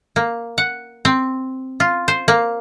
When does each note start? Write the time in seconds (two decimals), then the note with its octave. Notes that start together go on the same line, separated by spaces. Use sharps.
0.16 A#3
0.58 F#5
1.05 C4
1.80 F4
2.08 C5
2.28 A#3